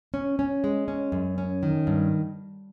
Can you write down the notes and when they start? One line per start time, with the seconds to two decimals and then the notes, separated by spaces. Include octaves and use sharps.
0.14 C#4
0.39 C#4
0.64 G#3
0.88 C#4
1.12 F#2
1.38 C#4
1.63 D#3
1.87 G2